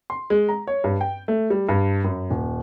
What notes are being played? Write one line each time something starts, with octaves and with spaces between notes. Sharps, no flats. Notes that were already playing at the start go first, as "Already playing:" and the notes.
C6
G#3
A#5
C#5
G2
G5
A3
G3
G2
F#2
D#1